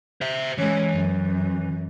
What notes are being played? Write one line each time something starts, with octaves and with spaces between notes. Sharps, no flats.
C5 E5
E3 G#3 C#4
F#2